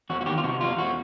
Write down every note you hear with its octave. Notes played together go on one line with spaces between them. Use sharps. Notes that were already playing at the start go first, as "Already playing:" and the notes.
E2 F#4
F#4
D#3 G4
F4
C3 F#4
E2 F4
E2 F#4